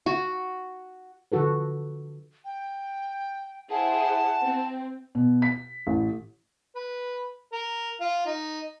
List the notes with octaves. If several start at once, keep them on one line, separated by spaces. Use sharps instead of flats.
F#4
D3 F3 F#4 A4 B4
G5
E4 G#4 C5 F#5 A5
C4
B2
B6
A1
B4
A#4
F4
D#4